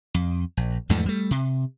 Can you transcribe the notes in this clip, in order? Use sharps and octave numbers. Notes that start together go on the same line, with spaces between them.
F2
A#1
E2 G#2 F3 A3
G3 A3
C3